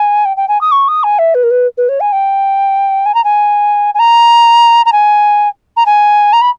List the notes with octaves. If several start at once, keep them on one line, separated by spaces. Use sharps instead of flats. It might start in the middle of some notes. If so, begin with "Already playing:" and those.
Already playing: G#5
G5
G5
G#5
D#6
C#6
D#6
G#5
E5
B4
A#4
B4
B4
C#5
G#5
G5
G#5
A#5
G#5
G#5
A#5
A#5
G#5
A#5
G#5
A#5
B5